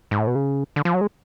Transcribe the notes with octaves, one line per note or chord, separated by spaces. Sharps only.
G#2
A2
B2
C#3
D3
F3
F#3
G#3